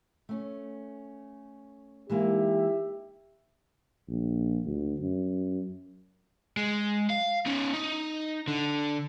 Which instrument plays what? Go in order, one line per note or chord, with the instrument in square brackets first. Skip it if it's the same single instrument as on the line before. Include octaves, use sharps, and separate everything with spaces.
[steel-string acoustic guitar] A3 C#4
[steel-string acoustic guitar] E3 G#3 A#3 [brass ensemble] D#4 G4 E5
[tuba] A#1
D2
F#2
[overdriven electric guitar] G#3
F5
C#4 D#4
D#4
D3